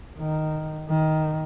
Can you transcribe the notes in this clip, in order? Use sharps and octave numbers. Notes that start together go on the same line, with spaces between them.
D#3
D#3